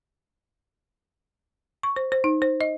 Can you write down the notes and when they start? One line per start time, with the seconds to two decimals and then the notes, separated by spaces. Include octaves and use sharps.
1.83 C#6
1.96 C5
2.12 C5
2.24 D#4
2.42 C5
2.61 D#5